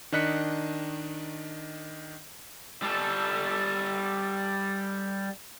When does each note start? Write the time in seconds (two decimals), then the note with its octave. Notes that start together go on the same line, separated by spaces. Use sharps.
0.12 D#3 D4 D#5 F#6 B6 C#7
2.83 G3 A4